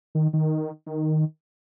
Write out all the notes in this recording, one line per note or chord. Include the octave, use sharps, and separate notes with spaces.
D#3
D#3
D#3